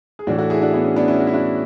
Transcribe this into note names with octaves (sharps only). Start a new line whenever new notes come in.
G#4
A2 E3 D4 F#4
F#4 A4
E4 G#4
D4 F#4
B3 D4
C#4
B3 D4
C#4 E4
F#4
E4
D4 F#4